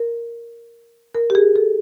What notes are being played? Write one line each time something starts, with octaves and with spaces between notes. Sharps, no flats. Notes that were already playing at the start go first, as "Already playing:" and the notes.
Already playing: A#4
A#4
G4
G#4
A4